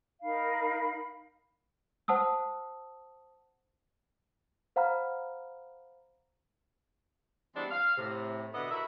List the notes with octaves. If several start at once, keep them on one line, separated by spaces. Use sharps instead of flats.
D#4 A#4 F5 B5
C5 F#5 A5 D#6 E6
C5 F5 F#5 A#5 B5 F6
E3 G3 G#3 B3 C4 D4
F5
A2 C3
B2 D3 B3 D#5 E5 F#5
E4 F#4 A#4 B4 E5